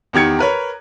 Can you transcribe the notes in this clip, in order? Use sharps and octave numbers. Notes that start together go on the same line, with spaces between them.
E2 D#3 G4 G#6 C#7
A#4 B4 C#5